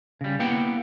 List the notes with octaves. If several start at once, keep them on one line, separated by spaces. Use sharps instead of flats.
C#3 G3
A#3 B3 E4 G4 F#5 G5